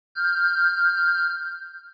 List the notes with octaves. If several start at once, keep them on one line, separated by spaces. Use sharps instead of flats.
F6 G6